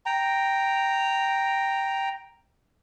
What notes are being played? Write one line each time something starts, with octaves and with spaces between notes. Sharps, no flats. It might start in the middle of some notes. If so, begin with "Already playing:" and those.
G5 A#5